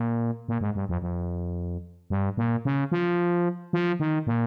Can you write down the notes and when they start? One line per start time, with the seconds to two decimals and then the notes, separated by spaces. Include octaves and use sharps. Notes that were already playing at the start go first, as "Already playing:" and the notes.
Already playing: A#2
0.48 A#2
0.61 G#2
0.75 G2
0.89 F2
1.02 F2
2.10 G2
2.37 A#2
2.65 C#3
2.92 F3
3.73 F3
4.00 D#3
4.27 A#2